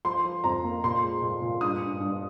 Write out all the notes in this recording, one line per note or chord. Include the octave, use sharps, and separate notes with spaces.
F3 C6
F3
F2 A#5
A#3
A#2 C6
G#3
A#2
A#2
G2 D#6
G2
G2